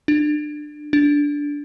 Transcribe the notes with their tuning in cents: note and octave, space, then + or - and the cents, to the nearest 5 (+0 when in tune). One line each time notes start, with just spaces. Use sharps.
D4 +25
D4 -10